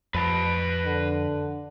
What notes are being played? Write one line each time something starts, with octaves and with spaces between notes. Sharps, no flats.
F2 B4 A5
D3